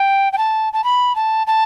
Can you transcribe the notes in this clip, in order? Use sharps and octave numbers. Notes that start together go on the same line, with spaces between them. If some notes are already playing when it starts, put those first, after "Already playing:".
Already playing: G5
G5
A5
A5
B5
A5
A5